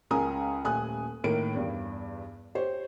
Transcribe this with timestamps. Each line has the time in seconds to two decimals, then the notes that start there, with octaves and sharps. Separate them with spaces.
0.11 C#2 C#3 A#4 G#5 A#5 D#6
0.64 D#1 A3 G#5 D#6 F#6
1.24 A2 D#3 A#3 D7
1.55 E2 G2
2.55 G4 C5 C#5